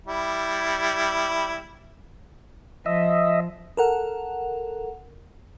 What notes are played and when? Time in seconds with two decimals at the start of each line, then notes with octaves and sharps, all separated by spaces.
0.07 G3 E4
2.86 F3 D#5 E5
3.77 A4 A#4 F#5